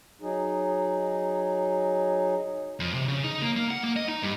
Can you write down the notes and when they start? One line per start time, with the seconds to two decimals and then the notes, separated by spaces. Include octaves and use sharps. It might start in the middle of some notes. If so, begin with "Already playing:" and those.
0.22 F#3 D#4 G#4
2.80 F2
2.94 C3
3.08 C#3
3.24 D#4
3.41 A#3
3.56 A#3
3.71 F#5
3.83 A#3
3.96 D#5
4.09 D#4
4.23 G2